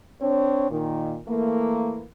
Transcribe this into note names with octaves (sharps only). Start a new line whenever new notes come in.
C4 D4 C#5
A#2 D#3
E3 A3 A#3